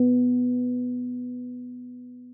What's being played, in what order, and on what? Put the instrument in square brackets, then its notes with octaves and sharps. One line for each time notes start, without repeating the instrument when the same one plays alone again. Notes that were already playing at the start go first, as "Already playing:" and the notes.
Already playing: [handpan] B3